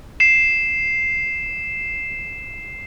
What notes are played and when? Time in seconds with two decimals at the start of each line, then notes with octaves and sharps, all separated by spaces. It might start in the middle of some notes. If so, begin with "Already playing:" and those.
0.20 C7 E7